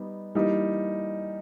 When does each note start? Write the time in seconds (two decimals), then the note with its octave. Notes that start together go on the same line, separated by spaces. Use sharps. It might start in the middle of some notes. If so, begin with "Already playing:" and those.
Already playing: G3 B3 D#4
0.35 E3 G3 A#3 D#4